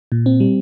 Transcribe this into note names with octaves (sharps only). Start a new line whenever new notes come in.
A#2
C4
G3